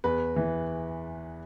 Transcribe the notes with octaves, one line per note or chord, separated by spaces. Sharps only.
E2 B4
E3